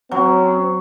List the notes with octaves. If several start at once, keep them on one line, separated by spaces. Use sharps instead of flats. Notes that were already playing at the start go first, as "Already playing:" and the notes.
F#3 C4 C#4